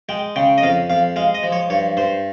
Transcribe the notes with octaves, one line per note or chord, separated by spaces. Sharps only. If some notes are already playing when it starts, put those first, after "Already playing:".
G#3 G5
C#3 G5
D#5
F2 F5
F2 F5
G#3 F5
D#5
F3
C#5
G2 C#5
G2 C5